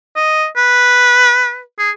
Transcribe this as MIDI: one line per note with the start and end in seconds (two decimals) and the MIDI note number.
0.16 0.46 75
0.57 1.61 71
1.79 1.91 68